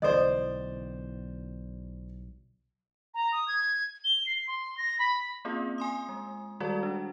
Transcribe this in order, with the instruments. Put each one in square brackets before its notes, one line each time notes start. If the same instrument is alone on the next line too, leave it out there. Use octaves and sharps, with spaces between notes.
[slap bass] B1 D3 E3 [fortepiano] C5 D5 [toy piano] D#5 D#6
[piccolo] A#5
D#6
G#6
G7
C7
C6
A#6
B5
[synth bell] A#3 C4 C#4 F4 G#4
G#5 C6 D#6
G#3
D#3 G3 G#3 F#4 A4 D5
D4